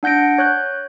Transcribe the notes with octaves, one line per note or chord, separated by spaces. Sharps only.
D4 F#5 G6 A#6 D7
C#5 F#6 G6